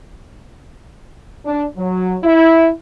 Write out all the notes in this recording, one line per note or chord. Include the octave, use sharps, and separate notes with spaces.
D4
F#3
E4